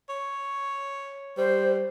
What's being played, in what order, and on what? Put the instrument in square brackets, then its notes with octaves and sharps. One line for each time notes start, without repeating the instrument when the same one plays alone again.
[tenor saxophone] C#5
[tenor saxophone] G3 [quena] C5